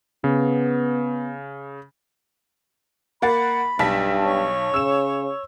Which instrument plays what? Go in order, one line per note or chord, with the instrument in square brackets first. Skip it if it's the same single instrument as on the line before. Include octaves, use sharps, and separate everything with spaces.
[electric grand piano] C#3 [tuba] B3
[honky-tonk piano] A#3 F#5 A6 [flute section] B5
[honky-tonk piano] B1 A5 B6 [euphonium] G2
[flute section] C#5 C#6
[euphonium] C#3 [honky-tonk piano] E6 E7